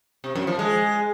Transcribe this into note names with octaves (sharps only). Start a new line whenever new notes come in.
C3
F#2
F3
G#3